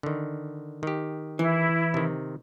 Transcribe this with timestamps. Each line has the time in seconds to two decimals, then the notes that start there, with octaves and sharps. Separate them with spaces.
0.03 D3 D#3
0.83 D#3 G4
1.39 E3 E4
1.94 C3 D#3